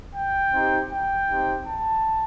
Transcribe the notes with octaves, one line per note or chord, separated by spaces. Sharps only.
G5
C4 D#4 G4
G5
C4 D#4 G4
A5